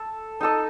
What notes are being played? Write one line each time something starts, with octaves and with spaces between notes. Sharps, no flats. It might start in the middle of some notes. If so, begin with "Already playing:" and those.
Already playing: A4
D#4 A4 D#5